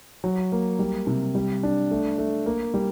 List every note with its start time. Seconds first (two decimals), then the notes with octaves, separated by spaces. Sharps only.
0.24 F#3
0.52 A#3
0.79 G3
1.07 C3
1.35 G3
1.63 D4
1.91 A3
2.18 A3
2.46 A#3
2.74 G3